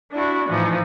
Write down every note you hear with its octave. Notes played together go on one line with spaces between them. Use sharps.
D4 E4 F#4
A2 E3 F3 D#4